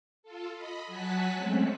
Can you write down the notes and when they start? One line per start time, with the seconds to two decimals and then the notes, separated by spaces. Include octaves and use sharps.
0.23 F4 A4
0.55 D#5 B5
0.87 F#3 F#4 G#5 A5 F#6 B6
1.35 F#3 G#3 A3 C4 C#4